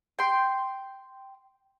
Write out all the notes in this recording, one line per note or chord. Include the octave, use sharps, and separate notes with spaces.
G5 C6